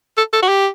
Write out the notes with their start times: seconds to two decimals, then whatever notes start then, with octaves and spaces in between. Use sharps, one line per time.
0.18 A4
0.34 A4
0.43 F#4
0.49 G4